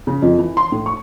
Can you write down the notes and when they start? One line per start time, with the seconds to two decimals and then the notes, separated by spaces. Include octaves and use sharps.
0.07 C#3
0.22 F2
0.39 E3
0.57 C6
0.72 A2
0.86 C#6